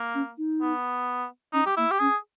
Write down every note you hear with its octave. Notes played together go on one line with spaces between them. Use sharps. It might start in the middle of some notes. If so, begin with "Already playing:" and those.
Already playing: A#3
C#4
D#4
B3
C#4 D#4
G4
A#3 E4
G4
C#4 G#4